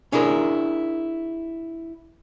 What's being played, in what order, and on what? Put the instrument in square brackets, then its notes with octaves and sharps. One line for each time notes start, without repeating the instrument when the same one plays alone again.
[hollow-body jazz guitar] C#4 D4 E4 G#4 A#4